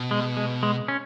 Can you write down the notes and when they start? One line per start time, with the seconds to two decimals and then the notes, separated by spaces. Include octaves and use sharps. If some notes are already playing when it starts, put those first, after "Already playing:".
Already playing: B2
0.11 G#3
0.37 G#3
0.63 G#3
0.88 C#4